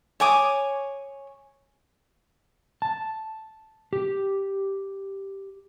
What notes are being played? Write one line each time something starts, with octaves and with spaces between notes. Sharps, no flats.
C#5 G#5 D6 D#6
A5
G4